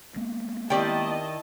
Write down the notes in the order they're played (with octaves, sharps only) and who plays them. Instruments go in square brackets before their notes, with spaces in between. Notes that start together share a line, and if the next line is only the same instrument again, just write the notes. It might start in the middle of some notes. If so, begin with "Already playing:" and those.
[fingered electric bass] G#3 A#3 B3
[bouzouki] D#3 D5 [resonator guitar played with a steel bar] C4 G4 G5 [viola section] E4 D#5 A5